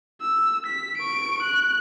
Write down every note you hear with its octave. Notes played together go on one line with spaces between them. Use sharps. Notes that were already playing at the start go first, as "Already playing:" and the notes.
E6
B6
C#6 D7
F#6